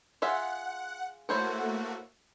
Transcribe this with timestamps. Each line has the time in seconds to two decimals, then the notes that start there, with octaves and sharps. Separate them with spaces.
0.22 F4 G#4 E5 F#5
1.29 A3 A#3 E4 F#4 C5 C#5